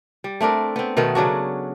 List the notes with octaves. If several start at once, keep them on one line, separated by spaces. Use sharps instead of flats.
G3
A3 C4 D4 A#4
B3 C4
B2 D#3 A3 B3
C#3 F#3 D4 F#4